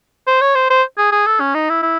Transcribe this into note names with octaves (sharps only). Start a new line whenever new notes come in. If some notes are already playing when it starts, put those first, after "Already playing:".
C5
C#5
C5
C5
G#4
G#4
A4
C#4
D#4
E4
E4